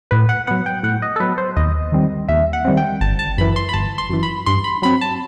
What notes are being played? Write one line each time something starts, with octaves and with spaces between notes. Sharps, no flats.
A2 B4
F#5
F#3 B3 F#5
G5
A2 F#5
D#5
A4
F#3 B3 B4
C5
D#2 D#5
D#3 G3 C4
D#2 E5
F#5
D#3 G3 C4
G5
G1 A5
A5
F#2 E3 B5
C6
B5
G1 A5
C6
F#2 E3
B5
G2 C6
B5
F#3 C4 B5
A5